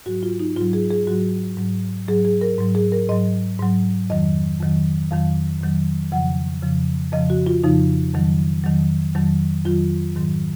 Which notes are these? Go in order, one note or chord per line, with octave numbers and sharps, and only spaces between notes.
G#2 F#3 F#4
F4
D#4
G#2 F#3 F4
G#4
G#4
G#2 F#3 F#4
G#2 F#3
G#2 F#3 G#4
G#4
A#4
G#2 F#3
G#4
A#4
G#2 F#3 D#5
G#2 F#3
F2 D#3 F#3 D#5
F2 D#3 F#3
F2 D#3 F#3 F5
F2 D#3 F#3
F2 C#3 F3 F#5
F2 C#3 F3
F2 C#3 F3 D#5
F#4
F4
F2 C#3 F3 D#4
F2 D#3 F#3
F2 D#3 F#3
F2 D#3 F#3
F2 D#3 F#3 F4
G#2 D#3 F#3